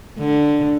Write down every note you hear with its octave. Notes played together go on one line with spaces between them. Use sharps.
D3